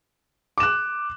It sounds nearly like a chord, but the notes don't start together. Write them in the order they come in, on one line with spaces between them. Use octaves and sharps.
D6 E7 F#6